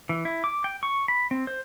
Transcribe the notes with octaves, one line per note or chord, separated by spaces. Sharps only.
E3
E4
D6
G5
C#6
B5
C4
C5